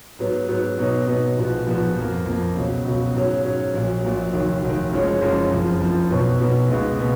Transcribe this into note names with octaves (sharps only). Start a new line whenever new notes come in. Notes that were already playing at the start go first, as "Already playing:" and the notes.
G#2 F#3 B3
G#2 F#3 B3
B2 F#3 B3 D#4
B2 F#3 B3 D#4
A#1 G#2 F3 B3 F#4
A#1 G#2 F3 B3 F#4
F2 F3 A#3
F2 F3 A#3
C#2 B2 F#3
C#2 B2 F#3
G#2 F#3 C#4
G#2 F#3 C#4
A#1 A#2 F#3
A#1 A#2 F#3
F1 D#2 D#3 F#3
F1 D#2 D#3 F#3
F#1 F#2 F3 G#3 C#4
F#1 F#2 F3 G#3 C#4
F#1 F2 F3
F#1 F2 F3
B1 B2 F#3 B3
B1 B2 F#3 B3
C#2 B2 G#3 B3 D#4
B2 G#3 B3